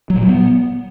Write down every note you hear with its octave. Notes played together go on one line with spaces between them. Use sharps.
F#3
A#2
F#3
B3